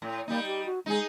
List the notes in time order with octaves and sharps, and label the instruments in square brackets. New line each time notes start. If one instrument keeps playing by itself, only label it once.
[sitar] A2
[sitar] G3 D#4 [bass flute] A#3
[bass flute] G4
F#4
[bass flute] G#3 [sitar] D#4 G#4